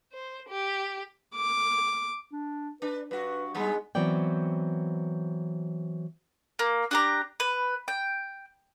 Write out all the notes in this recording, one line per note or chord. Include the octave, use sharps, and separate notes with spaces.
C5
G4
D6
D4
D4 B4
G2 F#4 B4
G2 G3 G#3 B3
E3 F#3 B3 C4 D5 G5
A#3
D4 G4 A#5
B4
G5